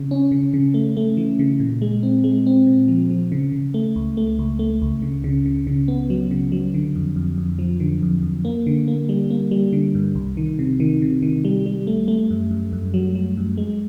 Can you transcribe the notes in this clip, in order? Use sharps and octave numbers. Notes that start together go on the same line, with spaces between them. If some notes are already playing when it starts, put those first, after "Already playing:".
Already playing: C#3
C#4
C#3
C#3
A3
A3
E3
C#3
A#2
G#3
C4
G#3
C4
A#2
F3
F3
C#3
C#3
A3
C#2
A3
C#2
A3
C#2
C#3
C#3
C#3
C#3
B3
F#3
C#3
F#3
D3
F2
F2
F2
F3
D3
F2
F2
A#3
D3
A#3
G3
A#3
G3
D3
G2
C2
D#3
C3
D#3
C3
D#3
G3
G3
A3
A3
F#2
F#2
F#2
F#3
F#3
F#2
G#3